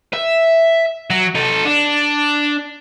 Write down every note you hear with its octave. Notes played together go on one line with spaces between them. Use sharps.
E5
F#3
D#4 A4
D4